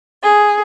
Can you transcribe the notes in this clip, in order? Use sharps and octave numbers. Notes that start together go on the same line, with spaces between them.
G#4